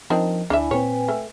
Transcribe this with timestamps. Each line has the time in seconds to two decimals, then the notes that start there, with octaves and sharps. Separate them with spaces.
0.10 F3 C4 D4 D#4 A#4
0.50 D2 D4 E4 E5 G#5 B5
0.71 A#2 C4 B4 C#5 G5 G#5
1.08 A3